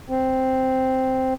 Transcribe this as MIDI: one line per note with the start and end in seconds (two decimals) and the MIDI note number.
0.09 1.34 60